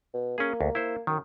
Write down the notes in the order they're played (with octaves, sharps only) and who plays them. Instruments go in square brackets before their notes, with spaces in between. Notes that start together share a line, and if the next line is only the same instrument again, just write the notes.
[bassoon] B2
[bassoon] A#3 [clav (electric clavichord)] C#4 G#4
[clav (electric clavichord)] D2
E4 C5
[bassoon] F#2 [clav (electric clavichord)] D#3